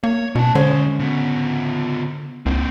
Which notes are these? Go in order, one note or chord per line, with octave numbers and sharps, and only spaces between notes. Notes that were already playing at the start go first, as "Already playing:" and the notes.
A#3 C#5
B2 C#4 A5
D#2 D3 G#3 C#4 C5
C#3 B3
C#2 A#3 C4